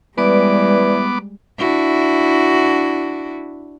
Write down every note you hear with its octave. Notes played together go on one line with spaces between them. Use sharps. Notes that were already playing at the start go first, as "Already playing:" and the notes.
E3 G3 G#3 B3 B4 D5 D6
D4 E4 F#4